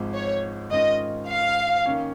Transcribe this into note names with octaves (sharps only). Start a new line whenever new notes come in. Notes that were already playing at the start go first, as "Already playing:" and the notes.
Already playing: G#1 G#2 F3 G#3
C#5
G#2 D#3 C#4 F4 D#5
F5
D#3 A#3 C#4